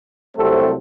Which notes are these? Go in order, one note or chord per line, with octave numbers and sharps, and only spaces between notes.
C2 C3 F#3 A3 C4 A4